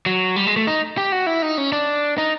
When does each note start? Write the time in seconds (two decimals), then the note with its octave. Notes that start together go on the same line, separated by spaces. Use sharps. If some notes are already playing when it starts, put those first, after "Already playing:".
0.06 F#3
0.36 G3
0.47 G#3
0.57 A3
0.67 D#4
0.98 G4
1.12 F#4
1.27 E4
1.42 D#4
1.58 C#4
1.72 D4
2.18 D#4